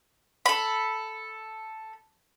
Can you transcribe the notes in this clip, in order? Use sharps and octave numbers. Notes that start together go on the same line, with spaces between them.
A4 B5